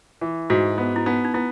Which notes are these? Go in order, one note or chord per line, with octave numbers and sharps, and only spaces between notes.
E3
G#2 F#4
B3
E4
B3 D#4
D#4
B3 E4